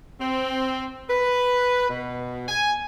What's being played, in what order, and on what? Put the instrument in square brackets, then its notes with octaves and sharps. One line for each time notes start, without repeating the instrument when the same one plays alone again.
[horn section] C4
B4
B2
G#5